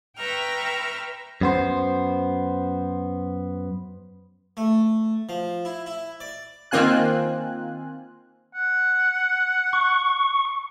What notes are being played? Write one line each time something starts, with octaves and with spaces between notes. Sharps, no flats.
B4 E5 G5 A#5 C#6 F6
F#2 B3 C5
A3
F3
E4
E4
D5
D#3 A#3 C4 F4 G#5 F#6
F#5
C#6